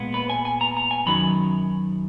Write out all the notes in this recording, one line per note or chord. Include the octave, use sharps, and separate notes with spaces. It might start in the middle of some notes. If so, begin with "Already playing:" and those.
Already playing: A#2 G#3 B3
B4
G#5
G#5
A#5
A#5
G#5
F#2 D#3 F#3 B5